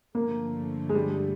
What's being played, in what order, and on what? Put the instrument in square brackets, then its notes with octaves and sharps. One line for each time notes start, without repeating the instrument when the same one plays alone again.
[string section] G2 D3 F3 A3 [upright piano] A#3
[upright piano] G#3
G3